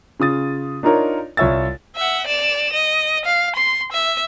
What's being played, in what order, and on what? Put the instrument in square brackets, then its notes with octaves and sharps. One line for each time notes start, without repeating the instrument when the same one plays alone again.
[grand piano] C#3 F4 D#6 A6
D4 D#4 F4 A#4 C#5 D5
C2 F4 C#5 E5 E6 A6
[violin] E5 F#5
D5 E7
D#5
F5
C6
E5